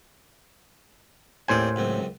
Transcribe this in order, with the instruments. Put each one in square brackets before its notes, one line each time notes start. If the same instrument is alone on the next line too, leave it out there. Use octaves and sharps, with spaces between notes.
[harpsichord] D#2 C4 D5 [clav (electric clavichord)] A2 C5 G#5
[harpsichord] C#2 F#2 C4